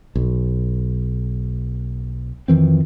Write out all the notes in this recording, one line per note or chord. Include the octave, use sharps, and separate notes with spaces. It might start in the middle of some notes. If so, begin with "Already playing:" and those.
B1
F2 D#3 E3 C4